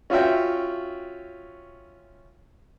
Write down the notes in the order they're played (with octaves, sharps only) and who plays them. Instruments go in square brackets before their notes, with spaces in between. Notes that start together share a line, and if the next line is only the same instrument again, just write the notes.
[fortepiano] C#4 F4 F#4 E5 G5